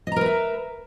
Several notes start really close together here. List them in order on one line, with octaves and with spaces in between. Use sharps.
D#5 A#5 A#4 B4 E5